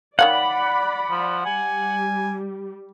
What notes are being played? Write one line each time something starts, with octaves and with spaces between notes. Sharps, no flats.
D#3 C#5 D5 F5 F#5 B5
F3
G3 G#5